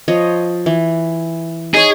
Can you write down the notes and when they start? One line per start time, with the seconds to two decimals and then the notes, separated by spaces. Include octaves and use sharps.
0.08 F3 C#5 D#5
0.66 E3
1.74 D#4 G#4 C#5